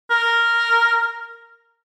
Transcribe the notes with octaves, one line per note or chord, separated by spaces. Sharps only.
A#4